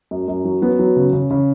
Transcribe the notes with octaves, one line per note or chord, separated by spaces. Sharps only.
F#2
F#2
F#3
F#3 B3
F#3
C#3
C#3
C#3